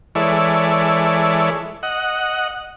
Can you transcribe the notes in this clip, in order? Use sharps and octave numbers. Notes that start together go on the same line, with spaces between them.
E3 G#3 E4 A4 C#5 D5
D#5 F#5